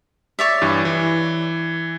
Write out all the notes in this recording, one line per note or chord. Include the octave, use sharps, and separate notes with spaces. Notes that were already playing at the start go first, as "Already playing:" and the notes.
C#5 D5 E5
G2 E3
E3